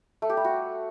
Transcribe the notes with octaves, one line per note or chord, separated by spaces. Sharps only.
A3
G4
G3
F#4